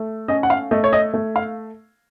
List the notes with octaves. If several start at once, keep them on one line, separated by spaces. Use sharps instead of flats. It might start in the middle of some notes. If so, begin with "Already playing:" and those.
Already playing: A3
C#4 D#5
F#5
F5
A3 D#5
C#5
D#5
A3
F5